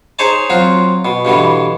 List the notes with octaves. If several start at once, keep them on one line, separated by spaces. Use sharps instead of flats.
D#4 G#4 C5 C#5 G#5 A5
F#3 C4 F4 F#4
B2
G2 B2 D3 E3